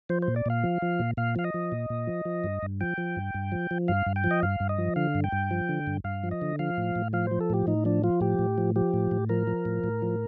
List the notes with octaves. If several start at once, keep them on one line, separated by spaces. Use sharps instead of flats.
F3 C5
C5
A#2
D5
A#2 F5
F3
F3
A#2
A#2 F5
F3 F5
D#5
F3
A#2
A#2
F3
F3
G2
G2
F3 G5
F3
G2
G2
F3
F3
G2 F5
G2
G5
F3
D#5
G2 F5
G2
D#5
F3
D3 F5
G2
G5
G2
F3
D3
G2
G2 F5
F3
D#5
D3
F3 F5
A2
A2
F3 F5
F3 C5
A4
A2 G4
A2 D#4
F3 D4
F3 F4
A2 G4
A2
F3
F3 G4
A2
A2
F3 A#4
F3
A2
A2
F3